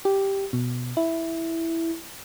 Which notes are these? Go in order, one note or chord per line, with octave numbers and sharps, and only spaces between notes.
G4
B2
E4